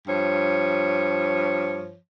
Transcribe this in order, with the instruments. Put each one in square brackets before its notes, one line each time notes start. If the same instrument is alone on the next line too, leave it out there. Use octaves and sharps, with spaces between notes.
[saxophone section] G2 F3 C#5